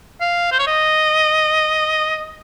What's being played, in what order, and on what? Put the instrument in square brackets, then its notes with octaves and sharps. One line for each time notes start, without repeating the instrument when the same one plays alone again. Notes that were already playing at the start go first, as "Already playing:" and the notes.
[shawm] F5
C5
C#5
D#5